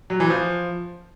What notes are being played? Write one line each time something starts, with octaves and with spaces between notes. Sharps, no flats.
F#3
E3
F3